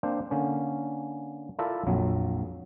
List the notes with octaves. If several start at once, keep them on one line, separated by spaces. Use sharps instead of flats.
A#3 C4 D4 C5
D3 A#3 C#4
E4 F4 A4 A#4 D5 E5
A#1 F2 F#3